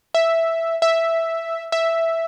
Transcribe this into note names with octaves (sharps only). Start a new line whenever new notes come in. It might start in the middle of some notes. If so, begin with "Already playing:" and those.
E5
E5
E5